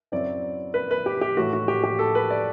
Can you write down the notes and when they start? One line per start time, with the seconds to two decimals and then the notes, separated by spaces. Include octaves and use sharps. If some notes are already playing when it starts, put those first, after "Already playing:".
0.12 F#2 F#3 C4 E4 D5
0.74 B4
0.91 B4
1.06 G4
1.21 G4
1.37 A2 E3 A3 F#4
1.53 F#4
1.68 G4
1.83 G4
1.99 A4
2.15 B4
2.30 D5